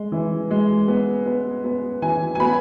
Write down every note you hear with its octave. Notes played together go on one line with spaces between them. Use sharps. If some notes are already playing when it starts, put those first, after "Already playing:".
Already playing: G#3
E3
G#3
B3
B3
B3
E3 G#5
G#5
B3 B5